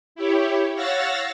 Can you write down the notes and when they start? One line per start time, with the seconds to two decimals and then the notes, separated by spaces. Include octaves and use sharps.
0.15 E4 G4 C#5
0.74 C#5 F5 F#5 E6 A6 A#6